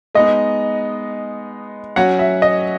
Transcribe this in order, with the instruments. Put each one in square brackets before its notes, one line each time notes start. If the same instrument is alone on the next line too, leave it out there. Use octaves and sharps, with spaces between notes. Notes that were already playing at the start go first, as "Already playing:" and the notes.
[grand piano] G#3 B3 D#4 [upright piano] D#5
[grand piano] F#3 C#4 F#4 [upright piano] F#5
[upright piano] E5
D#5